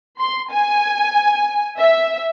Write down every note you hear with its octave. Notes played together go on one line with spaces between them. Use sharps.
C6
G#5
E5